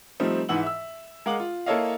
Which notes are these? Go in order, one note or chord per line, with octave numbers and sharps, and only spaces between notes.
F3 G3 A3 C4 D#4
G#2 E3 B4 F#5 E6 F#7
E5 E6
G#3 A#4 F5 F#5 D6 F#7
F4
A#3 E4 A4 C#5 D#5 F5